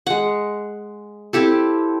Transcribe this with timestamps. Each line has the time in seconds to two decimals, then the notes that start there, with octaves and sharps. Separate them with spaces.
0.07 G#3 F#5
1.33 C4 E4 G4 A4